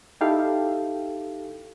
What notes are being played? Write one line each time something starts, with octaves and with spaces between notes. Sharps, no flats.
D#4 E4 G4 A4 F5 G5